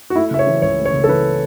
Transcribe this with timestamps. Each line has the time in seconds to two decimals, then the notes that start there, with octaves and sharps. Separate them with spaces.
0.10 F#4
0.16 A3 E4
0.31 C#3 E5
0.39 C#5
0.47 E3
0.62 C#2 C#5
0.78 A3
0.85 C#5
0.93 C#3
1.04 A4
1.08 E3 B4